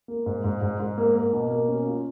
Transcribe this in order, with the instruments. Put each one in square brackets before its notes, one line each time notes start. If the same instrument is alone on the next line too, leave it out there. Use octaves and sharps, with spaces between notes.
[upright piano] A#3
G#2
G#2
G#2
G#2
A#3
A#3
B2
A#3
C#4
F4